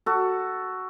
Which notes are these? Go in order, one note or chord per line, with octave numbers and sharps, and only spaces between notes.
F#4 A4